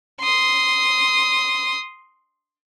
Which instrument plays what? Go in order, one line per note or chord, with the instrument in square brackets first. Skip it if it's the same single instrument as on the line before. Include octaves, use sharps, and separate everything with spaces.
[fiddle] C6 D#6